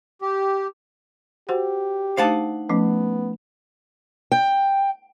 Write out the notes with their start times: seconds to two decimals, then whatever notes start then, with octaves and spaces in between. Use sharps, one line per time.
0.22 G4
1.49 F#4 G4 C5 F#5
2.17 A3 D4 D#4 C5 F5 F#5 A5
2.70 F3 A3 B3 C#4
4.32 G5